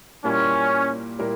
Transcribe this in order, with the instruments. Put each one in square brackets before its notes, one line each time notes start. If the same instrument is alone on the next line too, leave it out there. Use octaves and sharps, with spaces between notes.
[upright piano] A#2 G3 A#3 E4 A#4 [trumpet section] C#4
[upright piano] A#2 G3 A#3 E4 A#4